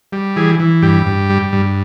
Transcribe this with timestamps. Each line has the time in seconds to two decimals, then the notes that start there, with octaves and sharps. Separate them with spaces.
0.12 G3
0.36 E3 G#4
0.60 E3
0.82 G2 G4
1.06 G2
1.30 G3
1.52 G2